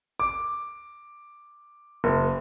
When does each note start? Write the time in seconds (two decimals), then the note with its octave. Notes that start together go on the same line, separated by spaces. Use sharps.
0.20 D6
2.04 F#1